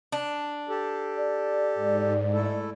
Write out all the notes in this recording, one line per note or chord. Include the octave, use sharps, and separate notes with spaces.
D4
G4 A4
D5
G#2
A3 E4 A4